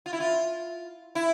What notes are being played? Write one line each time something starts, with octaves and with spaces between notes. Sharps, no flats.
F4
E4
F4
E4